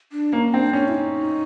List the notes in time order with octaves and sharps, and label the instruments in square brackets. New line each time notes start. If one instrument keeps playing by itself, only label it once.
[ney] D4
[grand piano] A#3 [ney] C#4
[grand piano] C4 [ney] D4
[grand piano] C#4 [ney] D4
[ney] E4
D#4